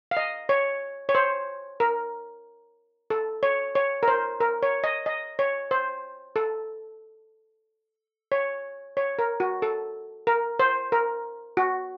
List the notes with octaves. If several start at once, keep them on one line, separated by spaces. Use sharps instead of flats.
F5
D#5
C#5
C#5
C5
A#4
A4
C#5
C#5
A#4
C5
A#4
C#5
D#5
D#5
C#5
C5
A4
C#5
C#5
A#4
F#4
A4
A#4
C5
A#4
F#4